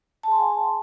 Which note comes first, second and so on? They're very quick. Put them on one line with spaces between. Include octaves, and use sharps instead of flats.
A5 G#4 C6 G#5 F#5